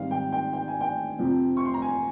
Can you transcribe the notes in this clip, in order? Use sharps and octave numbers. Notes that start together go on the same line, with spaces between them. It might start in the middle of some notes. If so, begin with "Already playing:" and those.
Already playing: G#2 D#3 G3 C4 F5
G5
G5
G5
G#5
G5
F2 C3 F3 C4
C#6
C6
A#5
G#5